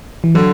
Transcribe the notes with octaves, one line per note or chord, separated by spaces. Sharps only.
E3
D3 F#3